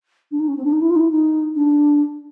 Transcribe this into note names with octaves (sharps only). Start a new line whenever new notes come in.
D4
D#4
C#4
C4
D4
D#4
E4
F4
D#4
E4
D#4
D4